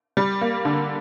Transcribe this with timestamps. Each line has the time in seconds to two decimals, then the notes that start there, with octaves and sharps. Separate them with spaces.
0.17 G3
0.41 A#3
0.65 D3